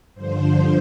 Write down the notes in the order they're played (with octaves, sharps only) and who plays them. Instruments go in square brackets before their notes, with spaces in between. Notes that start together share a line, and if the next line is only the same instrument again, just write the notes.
[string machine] G2 D3 F3 C5